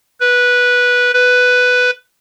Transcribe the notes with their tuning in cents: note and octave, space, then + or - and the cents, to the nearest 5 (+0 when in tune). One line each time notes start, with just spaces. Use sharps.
B4 -10
B4 +5